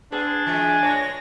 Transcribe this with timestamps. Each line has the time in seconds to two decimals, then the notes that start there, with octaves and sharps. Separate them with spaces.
0.12 B3 D4 G#4
0.47 E3 G#3 E5 G#5
0.83 A2 G#3 C#5 A#6